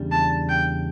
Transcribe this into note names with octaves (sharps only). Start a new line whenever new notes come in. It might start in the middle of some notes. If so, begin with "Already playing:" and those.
Already playing: E2 C#3 G3 D4
A5
G5